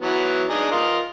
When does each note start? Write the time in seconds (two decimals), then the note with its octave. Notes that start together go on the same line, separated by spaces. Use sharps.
0.01 E3 F#3 B3
0.49 D4 D#4 G#4
0.72 F4 A#4 D#5